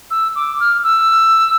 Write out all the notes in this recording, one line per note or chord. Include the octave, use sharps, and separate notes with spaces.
E6
D6
F6
E6